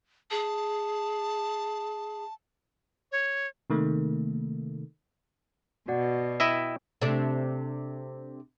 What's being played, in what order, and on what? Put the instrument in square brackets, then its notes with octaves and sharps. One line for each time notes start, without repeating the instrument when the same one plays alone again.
[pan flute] G#4 [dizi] A5
[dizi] C#5
[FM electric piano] C3 D#3 A3 A#3
[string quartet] B2 [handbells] F#4 D5 F#5
[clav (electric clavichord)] E4 D#5 E5 [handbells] G5
[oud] C3 A3 D4